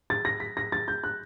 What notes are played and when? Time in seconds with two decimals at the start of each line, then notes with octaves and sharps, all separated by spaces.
0.10 A6
0.25 A#6
0.40 B6
0.57 A#6
0.72 A6
0.88 G6
1.04 F#6